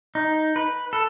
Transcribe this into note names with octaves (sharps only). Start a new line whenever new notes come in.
D#4
B4
A4